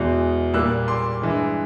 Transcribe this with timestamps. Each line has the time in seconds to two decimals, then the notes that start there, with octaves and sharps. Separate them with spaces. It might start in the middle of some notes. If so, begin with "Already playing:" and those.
Already playing: E2 B2 G#3
0.54 A#2 G3 A#3 E6 F#6
0.88 C6 D6
1.22 G2 E3 G#3